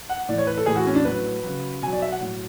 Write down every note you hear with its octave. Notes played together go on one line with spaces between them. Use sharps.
F#5
A2 E3 D5
C#5
B4
A4
A2 E3 G#4
F#4
C#4
D4
A2 F#3 B4
C#3 F#3
B2 F#3 G#5
D5
E5
F#5
A2 F#3